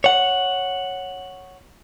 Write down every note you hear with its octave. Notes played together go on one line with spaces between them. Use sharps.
C#5 F#5